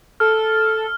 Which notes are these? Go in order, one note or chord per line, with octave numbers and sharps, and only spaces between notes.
A4 F6